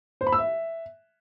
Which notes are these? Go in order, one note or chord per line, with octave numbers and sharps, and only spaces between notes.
C5
B5
E6
E5